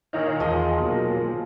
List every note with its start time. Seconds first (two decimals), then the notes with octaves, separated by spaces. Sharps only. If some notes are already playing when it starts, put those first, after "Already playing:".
0.13 A#2 D#3 D#4 C#5 F5 A#5
0.40 E2 F3 G#3 D#5
0.80 B2 F#3 A#3